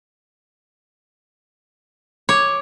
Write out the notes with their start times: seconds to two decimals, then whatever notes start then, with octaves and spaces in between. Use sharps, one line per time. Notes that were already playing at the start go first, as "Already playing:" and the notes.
2.29 C#5 D6